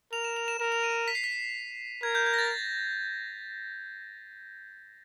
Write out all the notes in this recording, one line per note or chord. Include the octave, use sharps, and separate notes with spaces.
A#4 F7
E7
F7
E7
A#4 E7
F7
D#7
B6
C7
B6
A#4 G#6
G6
G#6
A#6
A6